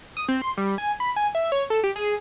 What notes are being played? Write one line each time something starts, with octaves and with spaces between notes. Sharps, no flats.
D#6
C4
C6
G3
G#5
B5
G#5
E5
C#5
A4
G4
G#4